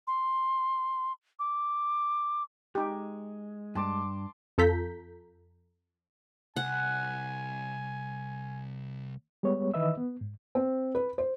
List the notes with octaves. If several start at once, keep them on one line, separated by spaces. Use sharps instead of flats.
C6
D6
G#3 D#4 G4
G2 A5 C6 D6
F2 F4 A4 A#5 G6 B6
C2 F#5 G#5
G3 G#3 B3 C#5
D#3 E3 B4 D#5 E5 E6
B3
G#2
C4
B4
C5